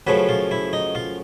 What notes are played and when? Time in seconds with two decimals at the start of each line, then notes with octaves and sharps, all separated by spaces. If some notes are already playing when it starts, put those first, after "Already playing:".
0.07 F#2 C#3 F3 A3 B4
0.29 F4
0.51 E4
0.73 D#4
0.95 F4